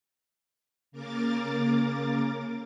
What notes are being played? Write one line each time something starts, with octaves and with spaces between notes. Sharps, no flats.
C#3 A#3 A#4 D6 A6